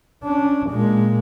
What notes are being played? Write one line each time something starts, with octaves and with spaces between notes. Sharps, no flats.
C#4 D4
A#2 G#3